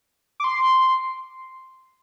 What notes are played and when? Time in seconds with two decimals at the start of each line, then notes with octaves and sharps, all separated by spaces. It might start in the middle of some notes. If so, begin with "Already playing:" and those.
0.40 D6
0.44 C6